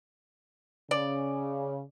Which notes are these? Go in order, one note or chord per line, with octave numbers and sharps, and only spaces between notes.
C#3 D5